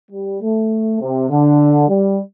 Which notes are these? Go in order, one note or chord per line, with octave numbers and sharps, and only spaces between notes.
G3
A3
C3
D3
G3